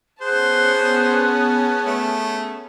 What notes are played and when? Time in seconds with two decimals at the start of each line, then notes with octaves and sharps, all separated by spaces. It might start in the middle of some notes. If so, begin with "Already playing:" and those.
0.22 B3 C#4 G#4 C5 F#5 A5 F#6
1.86 A3